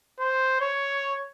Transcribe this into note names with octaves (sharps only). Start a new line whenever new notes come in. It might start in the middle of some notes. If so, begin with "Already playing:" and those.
C5
C#5